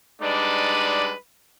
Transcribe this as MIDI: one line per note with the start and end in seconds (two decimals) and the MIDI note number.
0.20 1.13 55
0.20 1.13 56
0.20 1.13 62
0.20 1.13 63
0.20 1.13 71
0.20 1.13 74